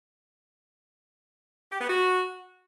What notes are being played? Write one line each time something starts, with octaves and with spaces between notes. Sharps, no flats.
G4
B3
F#4